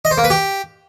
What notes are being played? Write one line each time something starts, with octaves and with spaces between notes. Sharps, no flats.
D#5
C5
A#3
B4
G4